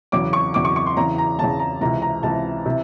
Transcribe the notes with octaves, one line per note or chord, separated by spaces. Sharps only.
E2 C#3 F#3 D6
C#6
E2 C#3 F#3 D6
C#6
C#6
C6
E2 C#3 E3 A#5
A#5
E2 C#3 E3 A5
A#5
C#2 C3 E3 A#5
A#5
C#2 C3 E3 A5
C3 E3